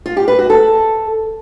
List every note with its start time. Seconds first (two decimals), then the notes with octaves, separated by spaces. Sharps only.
0.06 F4
0.17 G4
0.28 B4
0.39 F#4
0.50 A4